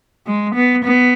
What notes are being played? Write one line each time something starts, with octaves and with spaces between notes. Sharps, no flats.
G#3
B3
B3